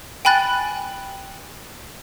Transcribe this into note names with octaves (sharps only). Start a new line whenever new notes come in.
G5 G#5 B5 F#6 A6